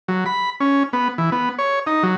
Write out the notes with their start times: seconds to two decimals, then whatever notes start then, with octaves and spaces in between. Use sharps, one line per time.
0.08 F#3
0.26 B5
0.60 C#4
0.93 B3
1.18 E3
1.32 B3
1.59 C#5
1.87 D#4
2.03 F#3